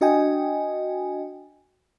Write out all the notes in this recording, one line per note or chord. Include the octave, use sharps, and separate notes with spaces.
D4 F#4 D#5 G5 G#5